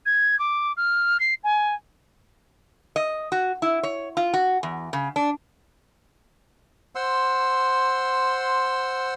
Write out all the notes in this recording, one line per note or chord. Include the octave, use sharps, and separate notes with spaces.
G#6
D6
F6
C7
G#5
D#5
F#4
E4
C#5
F4
F#4
E2
C#3
D4
C5 F#5 C6 E6